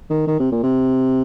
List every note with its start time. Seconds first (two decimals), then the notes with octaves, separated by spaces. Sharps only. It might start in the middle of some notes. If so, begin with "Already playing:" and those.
0.10 D#3
0.27 D#3
0.40 C3
0.52 A#2
0.63 C3